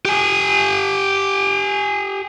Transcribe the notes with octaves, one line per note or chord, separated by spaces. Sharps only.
G4 G#5